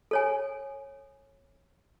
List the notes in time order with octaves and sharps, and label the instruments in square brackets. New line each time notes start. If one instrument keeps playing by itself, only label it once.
[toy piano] A4 C#5 G#5